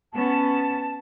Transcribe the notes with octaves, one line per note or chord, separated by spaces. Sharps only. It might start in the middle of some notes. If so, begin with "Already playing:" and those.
B3 C#4 A5